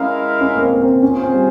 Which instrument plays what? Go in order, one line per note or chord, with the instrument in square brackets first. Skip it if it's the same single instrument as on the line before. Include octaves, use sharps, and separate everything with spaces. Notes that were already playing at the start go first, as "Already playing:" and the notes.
Already playing: [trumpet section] G#3 E4 A#4 F5 [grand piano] C#4
[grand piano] C#4
A#3
C4
A#3
C4
[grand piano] C#4 [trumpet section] F4 G#4 C5
[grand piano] C4
G3